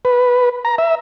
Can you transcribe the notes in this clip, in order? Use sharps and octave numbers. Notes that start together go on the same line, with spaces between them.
B4
A#5
E5